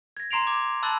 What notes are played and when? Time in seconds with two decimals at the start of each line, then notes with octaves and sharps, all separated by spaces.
0.17 G#6 A#6
0.31 A#5 C6 C7 D7 F7
0.47 D6 G#6
0.83 A5 B5 E6 F#6 A6 F#7